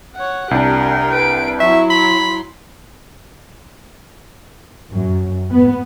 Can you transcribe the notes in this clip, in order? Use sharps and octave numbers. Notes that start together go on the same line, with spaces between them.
C#5 F#5
C2 D4 G4 A#4 G5
B4 D7
F#3 E4 E5 C#6
B5 C6
F#2
B3